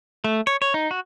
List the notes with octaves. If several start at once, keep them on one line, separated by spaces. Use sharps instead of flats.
A3
C#5
C#5
D#4
F#4